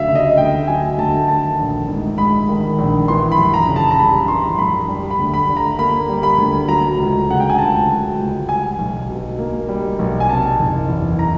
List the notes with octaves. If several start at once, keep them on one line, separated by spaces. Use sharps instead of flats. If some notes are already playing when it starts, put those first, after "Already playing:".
Already playing: D2 F#3 E5 F5
C#3
D#5
D2 G5
F#3 G#5
D2 A5
D#3 A5
A#1
G#2
G#3 B5
D#3
A#1
E3 C6
B5
F#2
A#5
C#3
A5
A#5
G3 B5
E3 C6
F#2 B5
G3
B5
D2
B5
D3
A#5
A#3 B5
G3
B5
D2
F#3 A#5
C#2
C#3 F#5
G5
G#5
C#2 A5
F#3
C#2
G3 G#5
B1
B2
A#3
G3
B1
G#5
C3 A5
F#1
E2
A#5